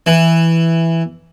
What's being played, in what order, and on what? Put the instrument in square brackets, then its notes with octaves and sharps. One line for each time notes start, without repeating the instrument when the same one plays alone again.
[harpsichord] E3